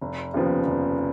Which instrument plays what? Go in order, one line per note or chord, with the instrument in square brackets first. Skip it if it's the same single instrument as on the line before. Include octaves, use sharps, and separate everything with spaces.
[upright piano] F1
D#2 C#3 F3 B3
F1